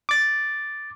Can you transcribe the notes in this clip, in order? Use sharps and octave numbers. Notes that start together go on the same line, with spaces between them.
D6 A6